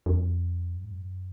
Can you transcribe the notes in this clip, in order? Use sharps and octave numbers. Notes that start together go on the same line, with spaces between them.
F2
F#2
G#2
F#2